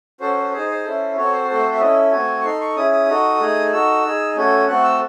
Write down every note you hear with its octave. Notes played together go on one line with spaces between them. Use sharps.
C#4 F#4 A4 C5
C5
G#4 C5
D#4
C5
C#4 E4 A4
C4 F#4 A4 C#5
C5
A3 C4 F#4 A4
E5
C#4 E4 A4 D#5
A3 C4 F#4 G#5
C#6
D#4 A4 C6
C#6
C#4 E4 G#4 D#6
D#6
D#4 F#4 A4
A3 D#4 G#4
D#4 F#4 A4 E6
D#4 G#4
A3 C#4 F#4 A4 G#5
A3 C4 F#4 A4 F#5
E6